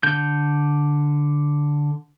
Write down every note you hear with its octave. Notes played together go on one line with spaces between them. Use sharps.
D3 G6